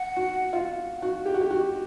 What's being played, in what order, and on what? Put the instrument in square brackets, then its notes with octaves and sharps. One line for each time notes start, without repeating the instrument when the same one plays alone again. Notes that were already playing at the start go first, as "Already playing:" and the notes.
Already playing: [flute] F#5
[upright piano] F#4
F4
F#4
G4
F#4
G4
F#4